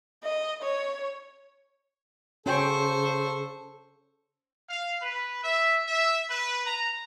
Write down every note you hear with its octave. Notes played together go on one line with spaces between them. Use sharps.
D#5
C#5
C#3 C#4 F#4 A4 C5 G5 C#6
F5
B4
E5
E5
B4
A#5